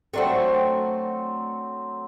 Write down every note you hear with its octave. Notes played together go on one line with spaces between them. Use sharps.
F#3 A3 C4 D4 F#4